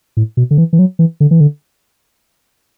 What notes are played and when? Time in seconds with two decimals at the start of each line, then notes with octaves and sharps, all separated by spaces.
0.17 A2
0.37 B2
0.51 D3
0.58 E3
0.73 E3
0.79 F#3
0.99 E3
1.20 D3
1.31 E3
1.40 D3